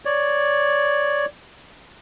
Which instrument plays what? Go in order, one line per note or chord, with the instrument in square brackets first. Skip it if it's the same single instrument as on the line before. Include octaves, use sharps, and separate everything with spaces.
[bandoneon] C#5 D5